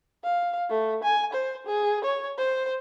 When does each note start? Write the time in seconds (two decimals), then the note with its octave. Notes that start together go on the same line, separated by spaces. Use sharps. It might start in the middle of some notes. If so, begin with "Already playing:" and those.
0.24 F5
0.70 A3
1.04 G#5
1.33 C5
1.67 G#4
2.04 C#5
2.38 C5